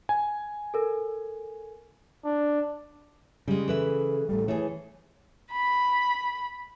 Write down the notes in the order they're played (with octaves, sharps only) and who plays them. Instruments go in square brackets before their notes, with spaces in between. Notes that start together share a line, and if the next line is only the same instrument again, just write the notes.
[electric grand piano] G#5
[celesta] A4 A#4
[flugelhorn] D4
[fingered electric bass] C#3 [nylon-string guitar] G3 G#3
[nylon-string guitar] E3 B4 E5 [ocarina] A4
[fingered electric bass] A1 G3 [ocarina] A4
[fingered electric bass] E3 [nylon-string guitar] A3 G#4 [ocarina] C#5
[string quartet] B5